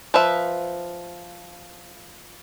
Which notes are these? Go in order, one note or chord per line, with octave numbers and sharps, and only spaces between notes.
F3 B4 E5